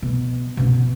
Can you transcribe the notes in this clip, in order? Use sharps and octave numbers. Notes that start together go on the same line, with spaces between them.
B2
B2 C#4